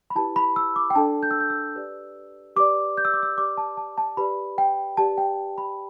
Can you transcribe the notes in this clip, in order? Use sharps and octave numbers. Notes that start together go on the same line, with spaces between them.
B5
E4 G4 B4 A5
B5
E6
D6
G5
D4 A4 D5 A5
G6
E6
G6
E6
G4 B4 D5
G4 B4 D5 D6
G6
E6
D6
E6
G4 B4 D5 D6
A5
A5
A5
G4 B4 D5 B5
G5
G4 B4 D5 A5
G5
B5